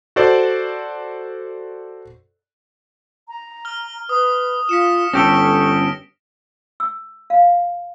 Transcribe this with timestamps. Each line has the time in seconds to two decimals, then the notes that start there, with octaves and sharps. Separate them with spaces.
0.16 F#4 A4 C5 D5
3.28 A#5
3.65 F6 G7
4.09 B4 D#6
4.69 F4 B6 C#7 E7
5.14 G1 C#4 G4 A4 C#6 A#6 D7 G7
6.80 E6
7.30 F5